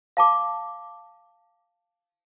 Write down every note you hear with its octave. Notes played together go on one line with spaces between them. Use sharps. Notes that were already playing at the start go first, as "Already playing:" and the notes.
F5 A5 D6